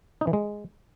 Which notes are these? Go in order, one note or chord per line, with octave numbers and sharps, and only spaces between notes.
D#4
E3
G#3